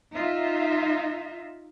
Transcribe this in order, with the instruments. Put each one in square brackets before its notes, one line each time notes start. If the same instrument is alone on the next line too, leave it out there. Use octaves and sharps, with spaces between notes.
[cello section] D#4 F4 E5